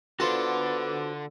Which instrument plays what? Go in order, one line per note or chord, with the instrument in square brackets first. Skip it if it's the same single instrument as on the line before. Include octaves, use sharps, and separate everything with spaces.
[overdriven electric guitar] D3 [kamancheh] B3 D6 [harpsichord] F4 A5 [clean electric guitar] F#4 A4 C5